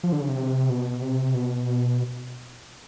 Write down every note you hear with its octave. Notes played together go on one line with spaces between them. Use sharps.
F3
D3
C#3
C3
B2
C3
B2